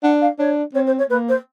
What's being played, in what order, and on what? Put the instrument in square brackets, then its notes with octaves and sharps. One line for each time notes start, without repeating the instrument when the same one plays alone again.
[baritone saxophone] D4 [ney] F#5
[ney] F5
[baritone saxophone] D4 [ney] C#5
[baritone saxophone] C4 [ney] C#5
[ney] C5
C#5
[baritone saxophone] A#3 [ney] B4
[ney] C5